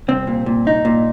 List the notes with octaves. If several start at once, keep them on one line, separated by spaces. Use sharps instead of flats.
C2 C4
A#2
A#2
C2 D#4
A#2